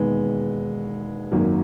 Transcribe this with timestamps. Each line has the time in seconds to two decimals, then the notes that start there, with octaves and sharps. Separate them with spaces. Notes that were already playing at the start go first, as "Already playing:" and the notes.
Already playing: E1 D#2 D#3 G#3 B3
1.32 G#1 F#2 D#3 F#3 A#3